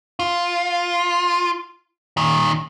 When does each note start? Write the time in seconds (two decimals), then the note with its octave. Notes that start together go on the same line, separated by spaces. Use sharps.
0.20 F4
2.17 A#2 D#3